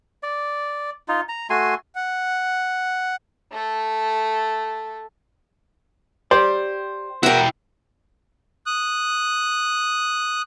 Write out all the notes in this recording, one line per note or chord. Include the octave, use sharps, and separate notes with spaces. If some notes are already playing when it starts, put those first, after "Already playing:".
D5
D#4 F4
A#5
A3 F#4 G#5 C6
F#5
A3 A4
G4 C5 D5
E4 F#4 A#4 G5
D#6 F#6